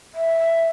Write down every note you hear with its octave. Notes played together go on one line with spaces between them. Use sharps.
E5